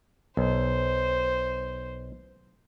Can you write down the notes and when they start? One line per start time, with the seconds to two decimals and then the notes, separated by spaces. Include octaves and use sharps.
0.37 B1 C5